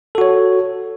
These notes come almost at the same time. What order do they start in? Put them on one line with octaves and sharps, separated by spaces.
A4 F#4 C#5